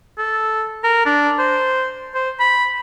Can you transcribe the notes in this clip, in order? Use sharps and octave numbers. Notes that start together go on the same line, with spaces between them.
A4
A#4
D4
C5
C5
B5